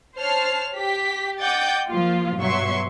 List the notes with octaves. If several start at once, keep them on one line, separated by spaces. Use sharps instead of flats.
C5 C#5 A5 F6 C7
G4 B6
D#5 F#5 G5 D6 G6 A6
F3 A#3 F4
G2 B2 F#3 E5 C6 C#6